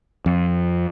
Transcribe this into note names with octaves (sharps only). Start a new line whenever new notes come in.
F2